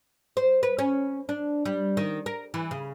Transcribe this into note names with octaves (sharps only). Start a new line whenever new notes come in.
C5
B4
C#4
D4
G3
D#3
A#4
E3
C#3